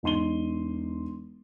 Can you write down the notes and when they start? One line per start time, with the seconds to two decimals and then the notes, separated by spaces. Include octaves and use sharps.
0.03 E1 D#4 C6 D#7 G7